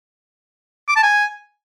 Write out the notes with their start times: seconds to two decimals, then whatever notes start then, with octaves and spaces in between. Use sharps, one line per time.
0.88 D6
0.96 A5
1.03 G#5